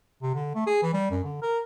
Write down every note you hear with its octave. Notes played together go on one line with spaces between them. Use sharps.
C3
D3
A3
G#4
E3
G3
F#2
D3
A#4